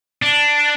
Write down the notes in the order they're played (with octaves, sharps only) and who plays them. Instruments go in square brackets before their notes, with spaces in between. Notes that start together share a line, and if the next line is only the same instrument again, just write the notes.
[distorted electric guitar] D4